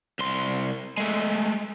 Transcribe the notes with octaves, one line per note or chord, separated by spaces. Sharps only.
C2 C6
G#3 A3